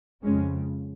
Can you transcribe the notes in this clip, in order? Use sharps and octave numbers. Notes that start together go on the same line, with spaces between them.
F2 C#3 G#3 C#4